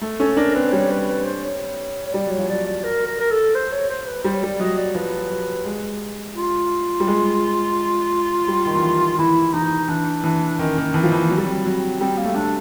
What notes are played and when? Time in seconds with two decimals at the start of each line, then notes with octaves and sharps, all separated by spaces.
0.01 A3
0.19 C#4 A4
0.37 D4 A#4
0.51 A#4
0.54 C4 B4
0.73 G3 C#5
0.91 B4
1.08 B4
1.25 C5
1.44 C#5
2.06 C#5
2.13 G3 D5
2.26 F#3 C#5
2.38 F3
2.49 F#3 D5
2.66 D5
2.84 A#4
3.07 A#4
3.20 A#4
3.31 A4
3.55 C5
3.72 C#5
3.90 C5
4.07 B4
4.24 G3 C5
4.34 C#5
4.42 G3 D5
4.60 F#3 D#5
4.78 D5
4.95 F3 B4
5.30 F#3
5.65 G#3
6.36 F4
7.00 G3
7.07 G#3
8.48 G3
8.66 D#3
8.75 E3
8.83 F3
9.19 E3 E4
9.53 E3 D#4
9.88 E3 D4
10.24 E3
10.59 D#3 C#4
10.78 D#3
10.94 E3 C4
11.03 F3
11.12 E3
11.30 F#3
11.38 G3
11.45 F#3
11.66 F#3
12.00 G3 C4
12.18 A#3
12.24 A3
12.35 A3 D4